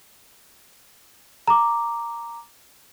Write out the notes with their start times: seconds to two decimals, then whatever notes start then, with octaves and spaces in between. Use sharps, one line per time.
1.48 A#5 D6